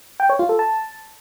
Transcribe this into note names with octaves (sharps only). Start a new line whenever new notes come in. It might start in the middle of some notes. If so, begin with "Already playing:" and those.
G5
C#5
F4
A4
A5